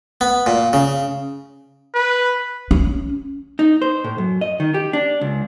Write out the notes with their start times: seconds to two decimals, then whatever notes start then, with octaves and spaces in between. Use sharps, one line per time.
0.21 B3
0.46 A#2
0.73 C#3
1.94 B4
2.71 C#4
3.59 D#4
3.82 C5
4.04 A2
4.18 F#2
4.41 D#5
4.60 D#3
4.74 G4
4.93 D4
5.21 C#2